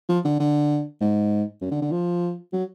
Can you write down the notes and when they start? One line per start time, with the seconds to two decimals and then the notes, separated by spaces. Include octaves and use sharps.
0.09 F3
0.25 D3
0.40 D3
1.01 G#2
1.62 F#2
1.72 D3
1.82 D3
1.92 F3
2.53 F#3